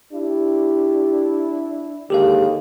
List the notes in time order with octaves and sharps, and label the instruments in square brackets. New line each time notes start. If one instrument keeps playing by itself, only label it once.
[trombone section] D4 E4 [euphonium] G4
[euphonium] D#2 [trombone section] D3 D#3 G#3 [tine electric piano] G4 A4 F5